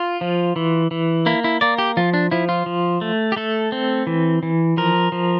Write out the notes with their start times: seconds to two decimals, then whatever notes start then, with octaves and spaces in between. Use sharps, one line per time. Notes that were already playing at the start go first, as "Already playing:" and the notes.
Already playing: F4
0.21 F3
0.56 E3
0.91 E3
1.26 A#3 E4
1.44 E4
1.61 A#3 D5
1.78 G4
1.97 F3 F4
2.14 D4
2.31 F3 E4
2.49 F4
2.66 F3
3.01 A3
3.32 G4
3.36 A3 A4
3.72 C4
4.07 E3
4.43 E3
4.77 F3 A#4
5.12 F3